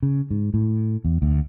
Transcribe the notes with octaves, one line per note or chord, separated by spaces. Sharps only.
C#3
G#2
A2
E2
D2